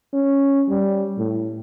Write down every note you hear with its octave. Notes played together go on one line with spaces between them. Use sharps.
C#4
G3
A2